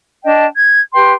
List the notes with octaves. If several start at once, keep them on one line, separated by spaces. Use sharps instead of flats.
D4 D#5 G5 A5
G#6
G4 B4 G5 C6